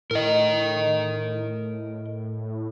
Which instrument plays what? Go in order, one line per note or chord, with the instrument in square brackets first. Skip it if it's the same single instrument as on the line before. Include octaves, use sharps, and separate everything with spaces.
[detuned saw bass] A2 [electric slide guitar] A#4 D#5